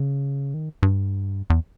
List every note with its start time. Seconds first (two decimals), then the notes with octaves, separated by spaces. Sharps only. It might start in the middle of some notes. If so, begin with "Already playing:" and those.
Already playing: C#3
0.54 D#3
0.83 G2
1.50 E2